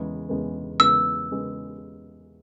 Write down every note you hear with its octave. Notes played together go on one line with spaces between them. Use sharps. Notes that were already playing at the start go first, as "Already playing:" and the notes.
Already playing: E2 C#3 G#3 B3
E2 C#3 G#3 B3
E2 C#3 G#3 B3 E6
C#3 G#3 B3